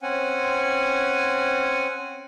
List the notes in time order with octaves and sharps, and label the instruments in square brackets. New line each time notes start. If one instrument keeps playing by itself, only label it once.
[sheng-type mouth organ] C4 C#4 F#5 G#5